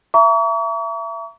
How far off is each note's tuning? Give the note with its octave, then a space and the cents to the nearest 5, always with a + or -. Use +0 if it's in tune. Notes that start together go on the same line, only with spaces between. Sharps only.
E5 +25 A#5 +0 C#6 +45